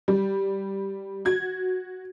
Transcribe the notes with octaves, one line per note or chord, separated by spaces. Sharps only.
G3
F#4 G#6